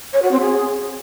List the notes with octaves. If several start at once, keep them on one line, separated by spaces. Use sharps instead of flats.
C#5
F#4
C4
G#4